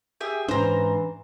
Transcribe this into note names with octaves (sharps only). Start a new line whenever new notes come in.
G4 G#4 E5
G#2 E3 C#4 D4 C5 A#5